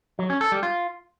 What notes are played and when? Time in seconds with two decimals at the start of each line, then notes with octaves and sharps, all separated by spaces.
0.19 F#3
0.30 C#4
0.41 A4
0.52 G3
0.63 F4